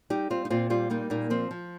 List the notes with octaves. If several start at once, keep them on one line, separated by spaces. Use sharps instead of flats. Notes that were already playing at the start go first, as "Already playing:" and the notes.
G3 D#4 G4
G3 C4 F4
D#4
A#2 C4 F4
G3 C4 F4
G3 A#3 D#4
A#2 A#3 D#4
F3 C4
F3